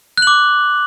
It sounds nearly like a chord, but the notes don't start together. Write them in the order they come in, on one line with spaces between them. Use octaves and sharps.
F#6 F#7 D6